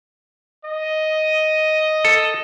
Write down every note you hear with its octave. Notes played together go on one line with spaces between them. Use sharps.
D#5
A4